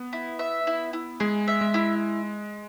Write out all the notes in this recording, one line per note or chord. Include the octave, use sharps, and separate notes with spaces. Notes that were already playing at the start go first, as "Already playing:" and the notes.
Already playing: B3
E4
E5
E4
E4
G#3 G#4
E5
G#3
E4